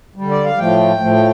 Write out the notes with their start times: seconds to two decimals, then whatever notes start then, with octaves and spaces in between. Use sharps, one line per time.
0.16 G3
0.21 D3
0.31 D5
0.44 F5
0.58 A2 F3 A3 G5
1.00 A2 F3 A3